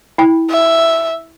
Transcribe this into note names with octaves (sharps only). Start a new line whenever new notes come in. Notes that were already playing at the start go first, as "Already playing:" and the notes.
E4 G5
E5